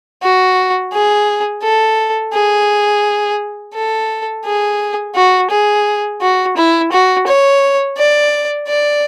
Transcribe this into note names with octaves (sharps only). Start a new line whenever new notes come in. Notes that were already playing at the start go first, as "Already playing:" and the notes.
F#4
G#4
A4
G#4
A4
G#4
F#4
G#4
F#4
E4
F#4
C#5
D5
D5